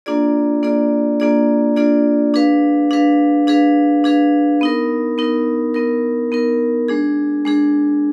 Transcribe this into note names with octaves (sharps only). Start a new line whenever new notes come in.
A#3 D4 F4 G#4 D5
A#3 D4 F4 G#4 D5
A#3 D4 F4 G#4 D5
A#3 D4 F4 G#4 D5
D4 G#4 B4 F5
D4 G#4 B4 F5
D4 G#4 B4 F5
D4 G#4 B4 F5
B3 D#4 A#4
B3 D#4 A#4
B3 D#4 A#4
B3 D#4 A#4
G#3 D4 G#4
G#3 D4 G#4